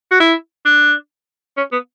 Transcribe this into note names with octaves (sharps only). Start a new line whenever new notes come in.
F#4
E4
D4
C#4
B3